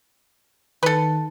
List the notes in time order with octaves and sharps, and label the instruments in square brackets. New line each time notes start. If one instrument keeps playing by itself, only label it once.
[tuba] D#3 [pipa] A4 B4